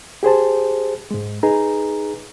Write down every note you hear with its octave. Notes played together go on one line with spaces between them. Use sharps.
G4 G#4 C5 A5
G#2 G#3
D#4 G#4 B4 A#5